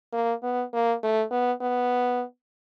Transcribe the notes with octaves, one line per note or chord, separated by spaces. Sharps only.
A#3
B3
A#3
A3
B3
B3